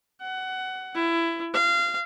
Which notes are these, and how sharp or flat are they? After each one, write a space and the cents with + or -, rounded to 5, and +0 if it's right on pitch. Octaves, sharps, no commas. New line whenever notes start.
F#5 +20
E4 +20
F5 -25